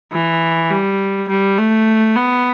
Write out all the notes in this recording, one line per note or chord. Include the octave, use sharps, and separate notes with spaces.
E3
G3
G3
A3
B3